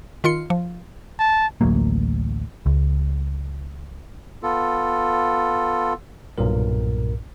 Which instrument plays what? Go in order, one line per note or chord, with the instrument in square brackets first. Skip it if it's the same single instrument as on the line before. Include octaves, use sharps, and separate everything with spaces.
[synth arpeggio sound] D#3 F4 C6 C#7
F3
[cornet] A5
[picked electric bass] A1 D2 F#3 A#3
C#2
[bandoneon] B3 F4 A4
[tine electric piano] B1 G2 A#2 A#4